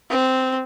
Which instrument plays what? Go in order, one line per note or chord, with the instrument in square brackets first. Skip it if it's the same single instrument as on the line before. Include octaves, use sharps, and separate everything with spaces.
[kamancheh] C4